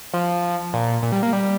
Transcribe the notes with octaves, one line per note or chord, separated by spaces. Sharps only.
F3
A#2
A#2
G3
A#3
G3